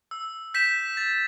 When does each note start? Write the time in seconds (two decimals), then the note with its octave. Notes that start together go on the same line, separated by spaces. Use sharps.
0.11 E6
0.54 G6 B6 E7
0.97 A6